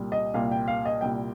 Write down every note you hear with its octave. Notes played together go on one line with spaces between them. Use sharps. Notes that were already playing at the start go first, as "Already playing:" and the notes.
Already playing: C2 A#2 G3
D#5
C2 A#2 G3 F5
G5
F5
D#5
C2 A#2 G3 G5